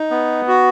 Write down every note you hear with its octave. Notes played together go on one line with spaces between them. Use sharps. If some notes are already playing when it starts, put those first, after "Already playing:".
Already playing: D#4
B3
F#4